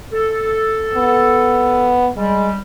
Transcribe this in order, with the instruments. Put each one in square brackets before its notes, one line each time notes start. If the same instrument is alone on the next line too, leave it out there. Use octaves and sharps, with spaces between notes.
[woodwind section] A4
[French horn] B3
[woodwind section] G3 [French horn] G#3